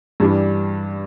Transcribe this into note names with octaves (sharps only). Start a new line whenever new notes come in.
G2 E3 G3 D4